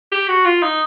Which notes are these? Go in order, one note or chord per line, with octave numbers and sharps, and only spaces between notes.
G4
F#4
F4
D#4